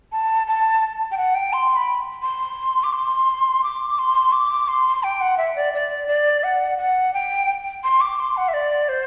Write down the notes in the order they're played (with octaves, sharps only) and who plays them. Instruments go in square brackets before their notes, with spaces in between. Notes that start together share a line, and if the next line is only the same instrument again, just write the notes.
[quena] A5
A5
G5
F#5
G5
C6
B5
C6
D6
C6
D6
C6
D6
C6
G5
F#5
E5
D5
D5
D5
F#5
F#5
G5
C6
D6
C6
F#5
E5
D5
C5